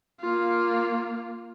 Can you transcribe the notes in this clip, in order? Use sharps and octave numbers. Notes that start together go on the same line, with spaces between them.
A#3 F4